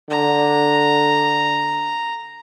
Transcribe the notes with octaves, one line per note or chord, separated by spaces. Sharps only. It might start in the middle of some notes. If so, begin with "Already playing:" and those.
D3 A#5